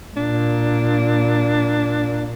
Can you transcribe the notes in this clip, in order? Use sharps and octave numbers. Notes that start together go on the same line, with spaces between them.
A#2 D4